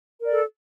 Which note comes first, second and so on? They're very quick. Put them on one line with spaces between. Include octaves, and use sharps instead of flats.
A#4 D5 A4